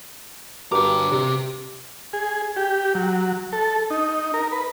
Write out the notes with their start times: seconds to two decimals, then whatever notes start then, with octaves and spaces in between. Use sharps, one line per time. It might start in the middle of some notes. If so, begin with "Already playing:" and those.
0.72 G2 F#4 G4 A#4 A#5 D6
1.12 C3 G4
2.13 G#4
2.56 G4
2.95 F#3
3.53 A4
3.90 D#4
4.34 A#4
4.52 B4